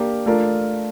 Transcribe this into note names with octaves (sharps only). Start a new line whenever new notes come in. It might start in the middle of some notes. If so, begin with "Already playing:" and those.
Already playing: A#3 D4 G4 A#4
A3 D4 F4 A#4